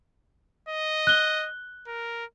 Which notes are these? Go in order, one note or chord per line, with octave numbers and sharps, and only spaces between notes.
D#5
F#6 G7
A#4